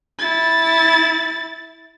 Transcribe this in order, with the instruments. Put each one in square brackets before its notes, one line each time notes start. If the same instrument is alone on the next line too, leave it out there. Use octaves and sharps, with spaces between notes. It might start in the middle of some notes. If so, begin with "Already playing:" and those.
[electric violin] E4 A6